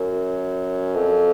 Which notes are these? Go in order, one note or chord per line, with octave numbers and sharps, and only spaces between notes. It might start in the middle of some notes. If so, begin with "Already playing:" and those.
Already playing: F#2
F2